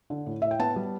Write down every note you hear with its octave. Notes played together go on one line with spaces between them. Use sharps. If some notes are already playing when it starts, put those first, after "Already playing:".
D3
A2
A2 E5
G5
B3 A5
G3